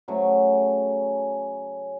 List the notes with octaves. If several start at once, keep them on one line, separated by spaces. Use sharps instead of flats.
C#3 F#3 A3 C#4